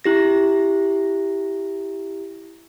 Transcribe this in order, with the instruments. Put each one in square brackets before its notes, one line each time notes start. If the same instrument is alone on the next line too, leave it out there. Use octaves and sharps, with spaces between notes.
[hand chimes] E4 G4 A#6